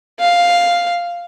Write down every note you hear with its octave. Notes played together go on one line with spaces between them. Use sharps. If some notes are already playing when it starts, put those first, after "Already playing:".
F5